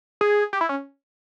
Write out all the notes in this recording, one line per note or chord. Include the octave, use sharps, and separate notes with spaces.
G#4
G4
E4
C#4